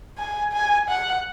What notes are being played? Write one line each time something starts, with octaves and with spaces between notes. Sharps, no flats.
G#5
G#5
F#5